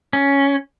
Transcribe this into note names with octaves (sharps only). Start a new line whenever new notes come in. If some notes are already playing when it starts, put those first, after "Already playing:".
C#4